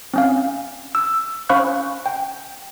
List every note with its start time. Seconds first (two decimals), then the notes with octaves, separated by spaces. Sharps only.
0.14 C4 C#4 F5
0.95 E6
1.49 C#4 C5 F5 B5 C#6 F#6
2.06 G5